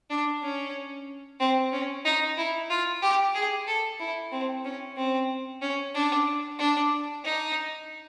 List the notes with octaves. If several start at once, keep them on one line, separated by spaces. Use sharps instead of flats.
D4
C#4
C4
C#4
D#4
E4
F4
G4
G#4
A4
E4
C4
C#4
C4
C#4
D4
D4
D#4